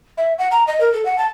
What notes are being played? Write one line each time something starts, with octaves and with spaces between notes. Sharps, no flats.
E5
F#5
A#5
D#5
A#4
A4
F#5
A5